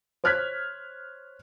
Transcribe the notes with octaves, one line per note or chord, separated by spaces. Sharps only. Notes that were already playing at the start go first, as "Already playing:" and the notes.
C5 C#5 F6 F#6 G#6 B6